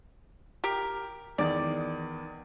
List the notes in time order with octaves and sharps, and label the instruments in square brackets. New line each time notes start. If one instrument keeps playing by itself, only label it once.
[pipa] G4 A#4
[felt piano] E2 D#3 A6 [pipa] D5